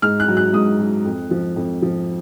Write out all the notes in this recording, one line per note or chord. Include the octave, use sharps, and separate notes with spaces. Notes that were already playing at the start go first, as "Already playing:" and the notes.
G#2 F6
F#6
F#3
F#6
G#2 D#6
F#3
F2
F3
F2
F3